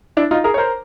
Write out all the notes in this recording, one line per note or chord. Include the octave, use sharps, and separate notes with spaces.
D4 E4
D#4 F4
G#4 A#4
C#5
A#4 C5